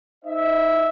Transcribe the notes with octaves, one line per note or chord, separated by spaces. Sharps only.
D#4 C5 D#5 E5